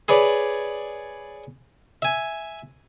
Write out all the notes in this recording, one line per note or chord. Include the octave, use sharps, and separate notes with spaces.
G#4 B4 C#5 D5 B5
E5 G#5